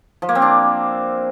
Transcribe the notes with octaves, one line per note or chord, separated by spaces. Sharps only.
F3
A#3
C4
D4